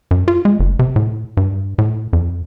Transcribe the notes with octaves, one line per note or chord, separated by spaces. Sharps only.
F#2
F4
G#3
F#1
C3
A2
G2
A2
F2